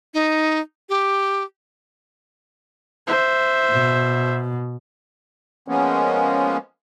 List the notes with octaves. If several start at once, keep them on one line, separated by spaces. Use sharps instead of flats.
D#4
G4
C5 E5
B2
F3 G#3 A#3 B3 C#4